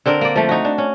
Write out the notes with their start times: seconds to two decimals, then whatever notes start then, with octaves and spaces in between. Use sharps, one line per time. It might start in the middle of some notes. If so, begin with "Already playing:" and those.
0.06 D3 C4 D4 A#4
0.21 A#3 D5
0.36 F3 A3
0.49 D#4 F#4
0.65 D4
0.78 C#4